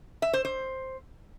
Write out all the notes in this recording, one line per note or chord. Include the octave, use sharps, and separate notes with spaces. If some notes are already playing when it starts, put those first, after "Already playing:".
E5
C5
C5